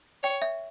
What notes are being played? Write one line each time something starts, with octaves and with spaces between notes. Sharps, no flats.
C#5 G5
E5